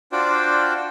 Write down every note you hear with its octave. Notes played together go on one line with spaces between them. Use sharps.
D4 F4 F#4 C5 D5 G5